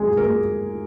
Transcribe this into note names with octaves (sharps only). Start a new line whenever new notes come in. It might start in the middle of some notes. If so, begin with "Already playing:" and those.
Already playing: G#2 F#3 G#3 D#4 G#4
A#3 A#4